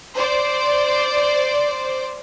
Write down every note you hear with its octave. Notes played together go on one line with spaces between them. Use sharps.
C5 D5